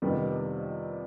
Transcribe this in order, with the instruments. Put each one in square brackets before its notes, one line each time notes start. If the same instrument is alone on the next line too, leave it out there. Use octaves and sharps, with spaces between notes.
[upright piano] F2 C3 D#3 G3 B3